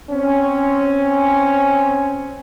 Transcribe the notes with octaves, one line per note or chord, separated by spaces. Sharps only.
C4 C#4